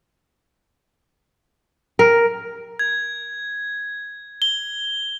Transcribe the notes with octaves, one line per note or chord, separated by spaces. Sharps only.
A#4
G#6
G7